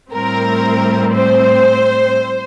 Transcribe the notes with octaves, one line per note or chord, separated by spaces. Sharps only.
A2 G3 C4 A#4
C5